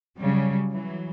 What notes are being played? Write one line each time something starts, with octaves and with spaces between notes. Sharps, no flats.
C#3 F#3 G3
E3 F#3